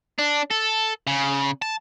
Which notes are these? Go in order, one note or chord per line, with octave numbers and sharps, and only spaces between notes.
D4
A4
C#3
A5